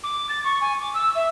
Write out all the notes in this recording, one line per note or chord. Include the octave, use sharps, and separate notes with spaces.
D6
A6
C#6
G#5
D6
E6
E5